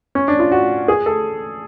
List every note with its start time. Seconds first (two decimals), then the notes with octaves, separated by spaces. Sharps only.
0.15 C#4
0.28 D4
0.39 F4
0.52 F#4
0.88 G#4
1.06 A4